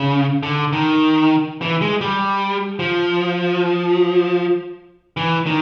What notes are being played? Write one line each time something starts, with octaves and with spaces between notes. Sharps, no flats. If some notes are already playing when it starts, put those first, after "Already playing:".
Already playing: C#3
D3
D#3
E3
G#3
G3
F3
E3
D#3